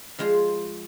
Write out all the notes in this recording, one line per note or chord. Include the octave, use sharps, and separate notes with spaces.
F3 G#3 F4 C5